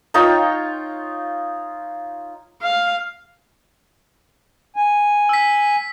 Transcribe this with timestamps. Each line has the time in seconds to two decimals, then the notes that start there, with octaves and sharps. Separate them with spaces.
0.14 D#4 F4 C#5 G5
2.62 F5
4.76 G#5
5.29 E6 B6